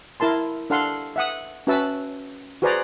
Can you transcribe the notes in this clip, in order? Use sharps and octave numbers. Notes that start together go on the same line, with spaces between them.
E4 A#4 A5 C6
D4 A4 F5 F#5 C6
E5 F#5 D#6
C#4 F#4 B4 E5 A5 E6
F#4 G#4 B4 C5 D5 A#5